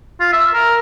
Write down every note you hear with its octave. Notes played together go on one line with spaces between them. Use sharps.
F4
E5
A#4